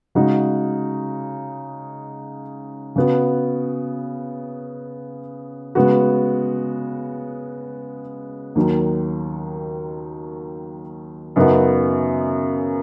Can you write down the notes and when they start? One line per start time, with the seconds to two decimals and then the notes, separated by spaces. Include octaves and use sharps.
0.15 C#3 G#3 D#4 F#4
2.96 C#3 B3 F#4
5.75 C#3 G#3 B3 F#4
8.55 D#2 D#3 F#3
11.36 F#2 C#3 B3 D#4 F#4